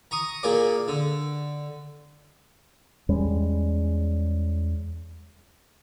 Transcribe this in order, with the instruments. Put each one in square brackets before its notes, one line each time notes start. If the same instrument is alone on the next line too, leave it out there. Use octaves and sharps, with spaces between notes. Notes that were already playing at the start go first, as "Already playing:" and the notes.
[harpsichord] A#5 C#6 D#6
A#2 A#3 G#4 D5 D6
D3
[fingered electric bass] E2 G3 G#3 C#4